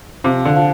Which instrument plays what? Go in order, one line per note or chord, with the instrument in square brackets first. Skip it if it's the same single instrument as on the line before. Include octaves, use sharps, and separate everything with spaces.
[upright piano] C3 [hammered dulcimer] F3
[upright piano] D3
[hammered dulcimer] F3